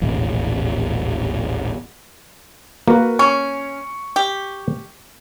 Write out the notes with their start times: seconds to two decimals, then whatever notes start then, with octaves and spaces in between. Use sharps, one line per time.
0.01 D#1 A1 E2 B2
2.88 A#3 F#4 A#4 B4
3.19 C#4 C#6
4.16 G4